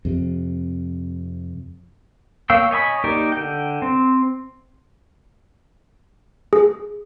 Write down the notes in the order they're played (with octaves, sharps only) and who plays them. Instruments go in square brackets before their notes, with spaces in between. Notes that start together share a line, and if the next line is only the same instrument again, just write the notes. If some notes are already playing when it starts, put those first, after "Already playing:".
[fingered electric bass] F2 C3
[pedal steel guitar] A#3 C#5 F5 G5 E6
C#5 D#5 G#5 B5
A#3 D#4 G4 A#4 D5
D3 G5
C4
[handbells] G#4